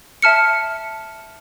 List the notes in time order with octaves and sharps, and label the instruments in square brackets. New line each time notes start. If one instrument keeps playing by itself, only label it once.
[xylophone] E5 A5 F6 C#7